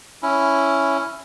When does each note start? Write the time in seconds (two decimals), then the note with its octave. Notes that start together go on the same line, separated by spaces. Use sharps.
0.23 C#4 E4